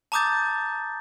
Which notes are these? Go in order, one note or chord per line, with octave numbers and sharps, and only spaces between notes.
A5 A#5 D6 D#6 G6 A6